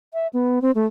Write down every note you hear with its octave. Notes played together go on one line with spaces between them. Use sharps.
E5
B3
C4
A3